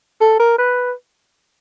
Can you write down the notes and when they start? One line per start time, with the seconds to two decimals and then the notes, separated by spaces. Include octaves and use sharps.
0.21 A4
0.39 A#4
0.58 B4